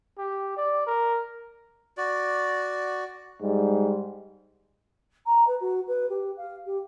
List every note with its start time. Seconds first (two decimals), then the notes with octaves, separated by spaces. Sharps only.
0.18 G4
0.57 D5
0.87 A#4
1.97 F#4 D5
3.42 G#2 G3
5.26 A#5
5.47 B4
5.61 F#4
5.88 B4
6.09 G4
6.37 F5
6.66 G4